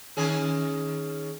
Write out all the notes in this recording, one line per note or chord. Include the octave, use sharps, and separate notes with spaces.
D#3 C#4 G#4